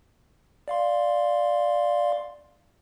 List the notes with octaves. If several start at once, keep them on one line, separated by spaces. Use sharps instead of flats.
D5 F5 C6